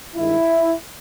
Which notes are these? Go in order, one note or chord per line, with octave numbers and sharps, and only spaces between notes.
G2 D#3 G#3 E4